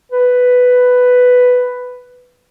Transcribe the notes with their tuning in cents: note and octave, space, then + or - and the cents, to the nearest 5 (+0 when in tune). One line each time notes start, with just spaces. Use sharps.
B4 +5